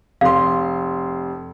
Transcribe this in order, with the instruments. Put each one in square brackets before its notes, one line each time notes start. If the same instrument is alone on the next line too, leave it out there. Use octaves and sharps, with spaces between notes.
[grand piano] F1 C6 [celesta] F5